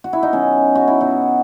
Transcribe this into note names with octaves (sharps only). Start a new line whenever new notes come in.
F#4
E4
D#4
B2 F#3 C#4
F#4
E4
B2 F#3 D#4